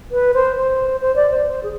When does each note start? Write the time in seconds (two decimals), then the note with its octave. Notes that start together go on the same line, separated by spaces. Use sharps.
0.11 B4
0.34 C5
0.56 C5
1.01 C5
1.16 D5
1.31 C5
1.46 C5
1.63 G#4